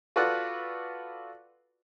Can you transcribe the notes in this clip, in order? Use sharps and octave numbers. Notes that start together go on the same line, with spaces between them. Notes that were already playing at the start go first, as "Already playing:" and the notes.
F4 F#4 A4 B4 D5 F#5